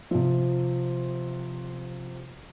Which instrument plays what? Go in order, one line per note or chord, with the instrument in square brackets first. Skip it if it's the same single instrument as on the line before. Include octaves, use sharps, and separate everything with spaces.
[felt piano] C3 F3